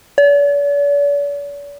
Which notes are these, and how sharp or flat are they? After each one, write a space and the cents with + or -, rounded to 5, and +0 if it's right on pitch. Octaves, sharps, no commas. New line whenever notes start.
D5 -45